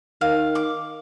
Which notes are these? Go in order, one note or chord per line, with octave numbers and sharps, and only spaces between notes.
D#3 F5
D6